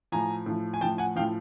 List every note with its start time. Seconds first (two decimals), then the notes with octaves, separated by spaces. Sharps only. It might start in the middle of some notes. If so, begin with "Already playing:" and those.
0.12 A2 F3 G#5 A#5
0.46 A2 F3
0.74 G#5
0.81 A2 F3 G5 A5
0.98 F#5 G#5
1.16 F3 F5 G5
1.19 A2